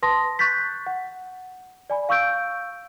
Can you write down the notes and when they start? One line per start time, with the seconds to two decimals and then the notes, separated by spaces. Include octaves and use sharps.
0.03 B4 A5 C6 D#6 A#6
0.39 C#6 F#6 G6 A6 B6
0.87 F#5
1.90 D5 G#5 B5
2.09 F5 C#6 E6 G6 D7